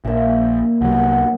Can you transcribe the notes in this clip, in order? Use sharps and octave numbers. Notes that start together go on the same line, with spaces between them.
A#1 A#2 E5
C2 F#3 F#5